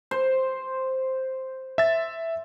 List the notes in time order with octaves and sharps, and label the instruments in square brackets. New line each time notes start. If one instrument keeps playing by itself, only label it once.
[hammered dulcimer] C5
[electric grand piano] E5 A6